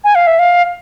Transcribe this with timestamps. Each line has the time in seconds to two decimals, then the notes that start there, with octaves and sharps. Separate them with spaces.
0.04 G#5
0.15 F5
0.27 E5
0.39 F5